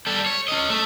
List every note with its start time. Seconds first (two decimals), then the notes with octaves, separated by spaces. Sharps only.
0.06 G3 A4
0.26 C#5
0.48 C#4 D#5
0.70 A3